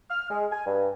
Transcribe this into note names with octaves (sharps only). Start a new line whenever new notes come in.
F6
G#3
G#5
G2